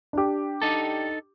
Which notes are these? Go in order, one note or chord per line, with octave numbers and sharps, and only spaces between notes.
D4 G4
D#4 A4